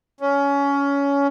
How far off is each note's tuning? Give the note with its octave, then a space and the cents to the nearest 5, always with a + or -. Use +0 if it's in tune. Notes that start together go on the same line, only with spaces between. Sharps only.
C#4 +20